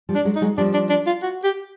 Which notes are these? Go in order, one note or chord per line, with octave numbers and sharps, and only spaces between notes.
F3 G3
D4
F#3 G#3
D#4
F#3 G#3
F3 G3 D4
D4
D4
F4
F#4
G4